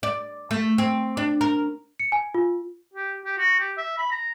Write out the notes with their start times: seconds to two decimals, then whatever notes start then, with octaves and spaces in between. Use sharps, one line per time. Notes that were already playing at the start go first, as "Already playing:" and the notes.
0.03 D5
0.51 A3
0.78 C4
1.17 D4
1.41 A#4
1.99 C#7
2.12 G#5
2.34 F4
2.94 G4
3.25 G4
3.38 F#4
3.59 G4
3.77 E5
3.98 B5
4.11 A#5